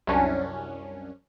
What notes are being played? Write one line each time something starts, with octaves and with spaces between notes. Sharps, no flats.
C2 F#2 C#4 D4